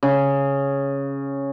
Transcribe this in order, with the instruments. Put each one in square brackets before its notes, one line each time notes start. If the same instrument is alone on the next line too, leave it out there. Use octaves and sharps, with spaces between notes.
[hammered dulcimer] C#3